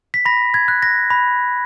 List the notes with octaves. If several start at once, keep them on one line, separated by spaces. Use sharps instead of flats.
B6
B5 A#6
G#6
F#6
A#6
B5